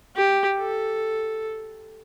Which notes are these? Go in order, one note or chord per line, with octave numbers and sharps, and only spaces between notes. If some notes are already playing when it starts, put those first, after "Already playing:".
G4
A4